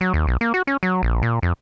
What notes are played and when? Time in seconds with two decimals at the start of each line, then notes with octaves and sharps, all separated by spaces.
0.01 F#3
0.13 D#2
0.27 B1
0.41 A#3
0.54 F#4
0.67 C#4
0.83 F#3
1.03 A#1
1.22 A#2
1.42 F2